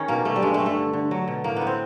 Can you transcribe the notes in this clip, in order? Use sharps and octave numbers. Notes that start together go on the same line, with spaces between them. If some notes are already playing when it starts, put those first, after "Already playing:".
Already playing: D#3 C#4 G#4
B2 A#3
B2 A3
G3
G2 G#3
A3
G2
A3
D3
D3
F#3
B2
A2 A#3
B3
A2
C4